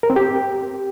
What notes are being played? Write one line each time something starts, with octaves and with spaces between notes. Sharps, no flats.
A#4
C4
G4